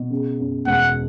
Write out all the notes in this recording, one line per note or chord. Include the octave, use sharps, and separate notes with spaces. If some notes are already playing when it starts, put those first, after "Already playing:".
Already playing: B2
C#3
F#2
E1 F#5